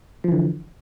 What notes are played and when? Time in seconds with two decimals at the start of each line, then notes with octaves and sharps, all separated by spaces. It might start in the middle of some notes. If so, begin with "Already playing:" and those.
0.24 F3
0.28 E3
0.32 D3